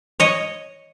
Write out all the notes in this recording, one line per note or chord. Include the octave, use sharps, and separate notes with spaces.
C#5 D#5